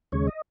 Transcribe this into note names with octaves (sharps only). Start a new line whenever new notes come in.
D#2 C#3 G#3 C#5
D#5